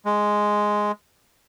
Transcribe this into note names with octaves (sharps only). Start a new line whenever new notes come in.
G#3